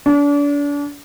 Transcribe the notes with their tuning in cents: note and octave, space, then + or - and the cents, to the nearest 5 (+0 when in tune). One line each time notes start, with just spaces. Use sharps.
D4 -35